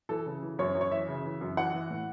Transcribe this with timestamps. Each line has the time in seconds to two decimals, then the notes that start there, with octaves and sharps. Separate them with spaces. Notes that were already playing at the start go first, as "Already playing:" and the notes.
0.09 E3 A4
0.26 C#3
0.42 E3
0.59 F#2 C#5
0.75 F#2
0.81 C#5
0.92 E3 E5
1.08 C#3
1.25 E3
1.41 F#2
1.57 E3 F#5
1.74 E3
1.90 A2